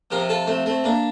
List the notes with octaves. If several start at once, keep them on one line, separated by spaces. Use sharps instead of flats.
C3 F3 G4 A#4
F4 A4
A3 C4
A3 C4
A#3 D4